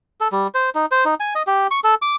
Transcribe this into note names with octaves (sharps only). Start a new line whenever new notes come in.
A4
G3
C5
D#4
C5
D#4
G#5
D#5
G4
C#6
A4
D6